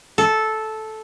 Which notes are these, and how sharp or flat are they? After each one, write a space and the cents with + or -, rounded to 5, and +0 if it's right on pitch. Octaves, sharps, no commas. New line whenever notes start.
A4 -10